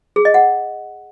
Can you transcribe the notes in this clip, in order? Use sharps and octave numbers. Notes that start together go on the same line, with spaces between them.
G#4
D#5
F#5